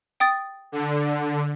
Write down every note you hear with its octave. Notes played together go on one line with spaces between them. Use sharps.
G5 D#6 A6
D3